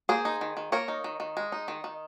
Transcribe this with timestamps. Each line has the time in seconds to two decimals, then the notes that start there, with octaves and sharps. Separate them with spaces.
0.09 A#3 G#4 C5
0.25 D#4
0.41 D#3
0.57 D#3
0.72 A#3 A#4 C#5
0.88 D#4
1.04 D#3
1.20 D#3
1.37 G#3
1.52 D#4
1.68 D#3
1.84 D#3